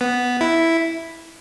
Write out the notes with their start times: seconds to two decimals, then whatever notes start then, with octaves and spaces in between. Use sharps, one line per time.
0.01 B3
0.41 E4